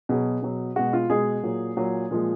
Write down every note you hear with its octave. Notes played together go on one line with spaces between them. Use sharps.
B2 F#3 G#4
B2 F#3
B2 G#3 F#4
F4
B2 G#3 G#4
A#2 F#3
A#2 F#3
A#2 F3 G#3